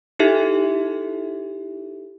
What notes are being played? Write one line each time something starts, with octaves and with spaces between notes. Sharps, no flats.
D#4 E4 G4 A4 E5